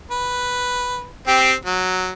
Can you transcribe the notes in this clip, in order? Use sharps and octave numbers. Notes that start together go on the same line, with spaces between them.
B4
C4 G4
F#3